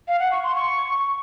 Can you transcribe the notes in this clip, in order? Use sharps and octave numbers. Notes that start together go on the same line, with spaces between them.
F5
F#5
C#6
C6
C#6